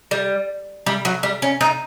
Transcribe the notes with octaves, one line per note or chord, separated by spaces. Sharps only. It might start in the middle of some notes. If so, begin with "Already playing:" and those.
G3
G3
F#3
G3
C#4
D#4